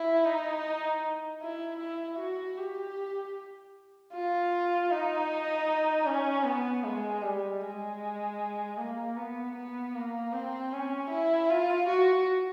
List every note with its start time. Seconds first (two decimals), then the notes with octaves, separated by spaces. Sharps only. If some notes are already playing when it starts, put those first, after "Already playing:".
Already playing: E4
0.25 D#4
1.41 E4
1.79 E4
2.18 F#4
2.57 G4
4.13 F4
4.91 D#4
6.06 C#4
6.45 B3
6.84 G#3
7.22 G3
7.61 G#3
8.78 A#3
9.16 B3
9.55 B3
9.94 A#3
10.33 C4
10.72 C#4
11.10 E4
11.50 F4
11.88 F#4